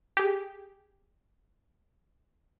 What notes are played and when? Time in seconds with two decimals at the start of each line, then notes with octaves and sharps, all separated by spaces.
0.17 G4 G#4